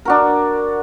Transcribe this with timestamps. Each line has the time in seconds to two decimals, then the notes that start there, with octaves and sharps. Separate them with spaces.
0.05 D4 F#4 A#4